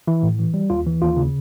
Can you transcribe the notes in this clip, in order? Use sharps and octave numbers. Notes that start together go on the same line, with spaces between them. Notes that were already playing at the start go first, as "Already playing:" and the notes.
E3 E4
A2
E3
G3
D#2 F4
E3
D#2 F4
C#3